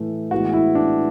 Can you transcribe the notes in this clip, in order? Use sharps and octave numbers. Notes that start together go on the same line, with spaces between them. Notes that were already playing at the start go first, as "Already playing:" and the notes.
Already playing: A2 E3 A3
A2 E3 G#3 B3 F#4
E4
D4